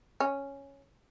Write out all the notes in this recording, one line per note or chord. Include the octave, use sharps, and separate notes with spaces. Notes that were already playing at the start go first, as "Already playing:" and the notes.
C#4